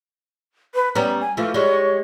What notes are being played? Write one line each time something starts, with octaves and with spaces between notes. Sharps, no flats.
B4
G3 B3 C#4 A#5
G#5
E3 F3 A3 F4
G3 G#3 C#5